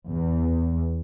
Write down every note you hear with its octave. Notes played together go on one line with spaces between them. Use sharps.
E2